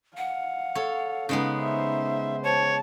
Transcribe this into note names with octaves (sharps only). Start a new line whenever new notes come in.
F5 F#5
A4 C#5
C#3 G#3 B3 D#4
C5 E5
C5 C#5 A5